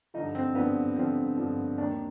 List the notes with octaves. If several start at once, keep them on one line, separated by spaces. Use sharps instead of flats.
G2 D3 F3 D#4
C4
G2 D3 F3 B3
G2 D3 F3 C4
G2 D3 F3
D#2 D#3 D4